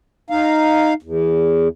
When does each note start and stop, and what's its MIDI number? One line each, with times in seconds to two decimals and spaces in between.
0.30 0.94 63
0.30 0.94 77
1.03 1.68 40